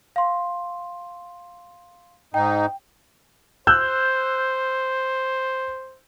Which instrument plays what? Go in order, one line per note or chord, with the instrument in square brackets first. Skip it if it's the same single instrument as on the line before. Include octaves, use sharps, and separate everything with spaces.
[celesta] F5 C6
[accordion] G#2 D#4 [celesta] G5
[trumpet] C5 [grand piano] E6 F#6 G6